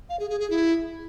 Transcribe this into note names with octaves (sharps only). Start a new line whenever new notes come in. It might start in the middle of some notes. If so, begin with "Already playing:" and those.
F5
G#4
G#4
G#4
E4